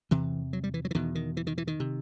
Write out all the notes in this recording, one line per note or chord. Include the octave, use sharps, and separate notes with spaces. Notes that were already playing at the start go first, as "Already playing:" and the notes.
E2 C3 E3
F#3
G3
E3
F#3
E3
E2 B2 D#3
D#3
E3
D#3
E3
D#3
C3